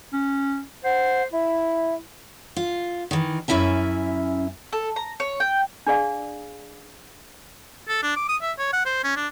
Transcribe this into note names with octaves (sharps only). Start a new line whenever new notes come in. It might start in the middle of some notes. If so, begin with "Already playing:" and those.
C#4
C5 F#5
E4 E5
F4
D#3 E3
F#2 C#4 E4 E5 G#5
A4
A#5
C#5
G5
D4 G#4 D5 F5
A4
D4
D6
D#6
E5
C#5
F#5
C5
C#4
D4